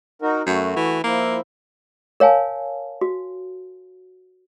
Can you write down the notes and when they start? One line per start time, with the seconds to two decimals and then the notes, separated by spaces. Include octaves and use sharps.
0.22 D#4 F#4 A#4
0.47 F#2 A3 F#4
0.76 E3
1.04 F3 A#3 E4
2.20 A#4 C#5 F5 G#5 A5
3.01 F#4